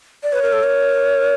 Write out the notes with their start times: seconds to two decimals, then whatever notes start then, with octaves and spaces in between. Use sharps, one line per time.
0.23 D5
0.32 B4 C#5
0.42 A#4
0.53 A4
0.63 A#4